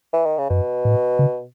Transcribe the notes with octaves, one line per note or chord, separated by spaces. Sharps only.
E3
D#3
C#3
F#2 B2
A2
C#3